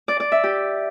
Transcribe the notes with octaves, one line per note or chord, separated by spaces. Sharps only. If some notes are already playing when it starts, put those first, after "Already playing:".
D5
D5
E5
G4